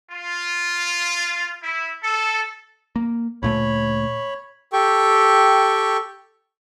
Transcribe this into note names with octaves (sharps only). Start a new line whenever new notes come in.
F4
E4
A4
A#3
D2 A#2 A3 C#5 B5
G4 A4 G5 C#6